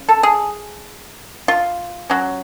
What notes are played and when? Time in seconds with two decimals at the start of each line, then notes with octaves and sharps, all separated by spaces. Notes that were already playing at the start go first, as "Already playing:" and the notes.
Already playing: C#3
0.09 A4
0.23 G#4
1.48 F4
2.10 F#3 C#4